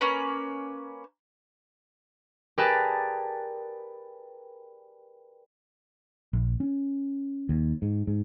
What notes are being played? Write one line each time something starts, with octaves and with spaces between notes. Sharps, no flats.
A#3 C#4 B4
G4 G#4 A#4 B4 D5 A5
A#1
C#4
D#2
G#2
G#2